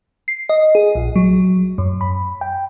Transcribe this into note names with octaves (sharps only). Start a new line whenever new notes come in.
C7
D#5
G#4
A#1
F#3
F#2
B5
G5